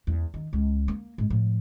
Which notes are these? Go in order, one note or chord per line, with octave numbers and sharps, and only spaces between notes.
E2
D#3
C#2
A#3
G#2
A2 F3